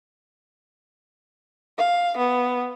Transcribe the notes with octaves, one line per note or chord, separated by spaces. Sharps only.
F5
B3